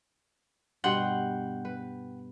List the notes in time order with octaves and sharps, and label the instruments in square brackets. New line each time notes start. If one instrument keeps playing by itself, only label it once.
[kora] G2 B2 B3 [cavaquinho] F#5 G5 C6
[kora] B4